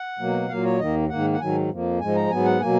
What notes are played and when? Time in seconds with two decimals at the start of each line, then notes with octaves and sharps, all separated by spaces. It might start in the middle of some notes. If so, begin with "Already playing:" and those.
Already playing: F#5
0.19 B2 F#3 A#3
0.48 A#2 F#3 A#3 F5
0.64 C#5
0.79 D#2 D#3 A#3 D#5
1.09 G#2 D#3 A#3 F#5
1.33 F#5
1.40 G#2 D#3 F#3 G#5
1.70 F2 F3 A#3
2.00 G#2 F3 G#3 G#5
2.15 A#5
2.30 G#2 F#3 B3 G#5
2.45 F#5
2.60 B2 F#3 A#3 G#5